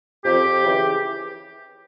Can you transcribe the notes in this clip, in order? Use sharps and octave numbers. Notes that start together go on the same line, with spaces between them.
F2 G4
C#3 E3